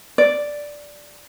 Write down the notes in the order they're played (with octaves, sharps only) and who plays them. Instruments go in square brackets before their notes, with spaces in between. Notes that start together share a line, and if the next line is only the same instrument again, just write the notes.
[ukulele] D5